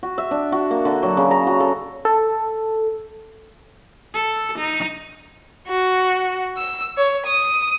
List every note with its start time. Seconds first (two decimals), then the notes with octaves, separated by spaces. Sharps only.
0.03 F#4
0.18 E5
0.31 D4
0.52 F#4
0.71 A#3
0.85 D3
1.03 F#3
1.17 C#3
1.31 A#5
1.47 F#4
1.60 A4
2.05 A4
4.14 A4
4.58 D#4
5.68 F#4
6.57 E6
6.98 C#5
7.26 D#6